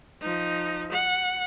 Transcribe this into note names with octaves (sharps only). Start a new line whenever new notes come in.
F3 D#4
F#5